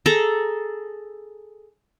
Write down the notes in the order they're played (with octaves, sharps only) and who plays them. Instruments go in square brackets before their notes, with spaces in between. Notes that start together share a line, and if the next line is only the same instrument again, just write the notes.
[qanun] G#4 A4 A#5